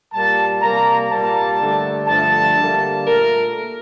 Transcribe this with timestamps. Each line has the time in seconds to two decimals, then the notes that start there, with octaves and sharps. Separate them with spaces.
0.13 A#2 G3 A#3 A5
0.61 C3 G3 A#3 A#5
1.10 A#2 G3 A#3 A5
1.59 G2 D3 A3
2.08 G2 D3 F3 A3 A5
2.57 D3 G3 A#3
3.06 A#2 A3 A#4